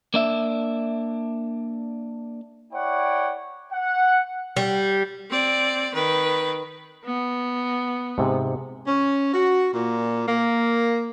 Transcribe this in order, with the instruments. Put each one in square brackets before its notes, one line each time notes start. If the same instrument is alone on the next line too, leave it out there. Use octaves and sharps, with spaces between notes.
[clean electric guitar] A#3 D4 E5
[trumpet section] E4 C#5 D5 F#5 G5
F#5
[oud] G3
[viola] C4 D5
D#3 B4
[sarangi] B3
[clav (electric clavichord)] G#2 C3
[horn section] C#4
F#4
A#2
A#3